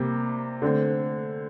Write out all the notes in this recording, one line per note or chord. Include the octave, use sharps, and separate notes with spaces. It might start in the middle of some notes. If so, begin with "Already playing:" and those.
Already playing: C3 G3 A#3
D3 A3 C4